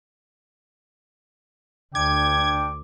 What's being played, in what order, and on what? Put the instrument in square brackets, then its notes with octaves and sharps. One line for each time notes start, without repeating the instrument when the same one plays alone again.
[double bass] D2 [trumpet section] D4 G5 [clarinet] D6 [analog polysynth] G#6